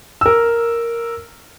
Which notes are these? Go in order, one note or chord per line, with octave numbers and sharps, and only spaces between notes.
A#4 E6